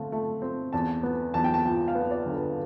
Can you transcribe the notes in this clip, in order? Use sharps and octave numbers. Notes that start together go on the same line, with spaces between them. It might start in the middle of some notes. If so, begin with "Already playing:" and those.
Already playing: D3 A3 C4 F5
A3
C4
E2 A5
B3
E2 A5
G5
A5
F3 G5
F5
B3
D5
D3
B4